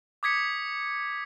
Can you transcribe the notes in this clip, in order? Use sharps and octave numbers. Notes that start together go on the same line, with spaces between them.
D6 D#6 G#6 B6 C#7